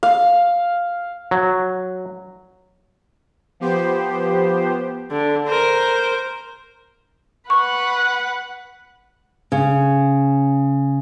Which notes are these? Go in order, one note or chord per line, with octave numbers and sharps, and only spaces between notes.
F5
F#3
F3 B3 G4 C5
D3
A#4 C5
B4 F#5 C#6
C#3